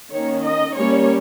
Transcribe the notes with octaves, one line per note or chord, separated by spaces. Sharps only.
D#3 A#3 C#4 C#5
D#5
G3 A#3 C#4 C#5